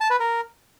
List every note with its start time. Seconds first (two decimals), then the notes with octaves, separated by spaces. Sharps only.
0.01 A5
0.10 B4
0.20 A#4